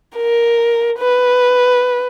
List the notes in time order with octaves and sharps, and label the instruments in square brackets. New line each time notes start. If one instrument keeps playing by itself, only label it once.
[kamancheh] A#4
B4